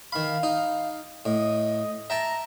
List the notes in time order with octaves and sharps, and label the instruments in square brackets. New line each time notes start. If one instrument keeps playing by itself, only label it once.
[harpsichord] D#3 B5 [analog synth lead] F5
[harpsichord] D#4
[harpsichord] A2 [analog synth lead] D#5
[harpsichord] E5 G5 A5 [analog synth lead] A#5